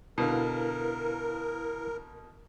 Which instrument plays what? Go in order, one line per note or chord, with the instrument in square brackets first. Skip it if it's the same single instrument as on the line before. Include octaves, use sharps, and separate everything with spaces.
[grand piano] B2 D3 [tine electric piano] E4 B4 F5 [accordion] A#4